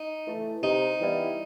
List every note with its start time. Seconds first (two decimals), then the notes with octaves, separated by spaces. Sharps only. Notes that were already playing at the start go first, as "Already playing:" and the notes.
Already playing: D#4
0.26 E3 A3
0.62 C3 D#4
0.99 E3 G3 B3 E4